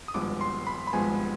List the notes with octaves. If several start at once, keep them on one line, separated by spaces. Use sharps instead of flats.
D#6
G#1 G2 F3 G#3 B3 D6
C6
B5
B5
G#1 G2 F3 G#3 B3 G#5